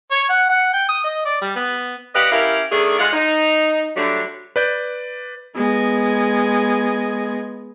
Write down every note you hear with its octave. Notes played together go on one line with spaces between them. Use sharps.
C#5
F#5
F#5
G5
D#6
D#5
D5
G3
B3
G4 B4 D5 D#5 F5 F#5
C#4 E4 G4 A#4 F5
D#3 A3 D4 G#4
G#3 F4 F#5
D#4
D3 F#3 G3 A3 D4
B4 D5 G6
G#3 B3